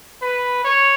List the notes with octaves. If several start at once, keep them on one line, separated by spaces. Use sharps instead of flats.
B4
C#5